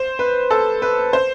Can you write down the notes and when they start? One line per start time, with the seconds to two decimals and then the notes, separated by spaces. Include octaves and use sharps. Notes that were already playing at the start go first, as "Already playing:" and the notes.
Already playing: C5
0.19 B4
0.51 A4
0.82 B4
1.13 C5